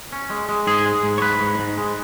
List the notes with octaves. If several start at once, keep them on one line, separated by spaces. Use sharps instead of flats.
C#4
G#3
G#3
G#2 G#4
G#3
G#2
C#5
G#2 B4
G#2
G#2
G#3